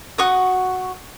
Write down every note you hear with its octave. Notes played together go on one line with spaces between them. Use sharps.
F#4 C#6 D#6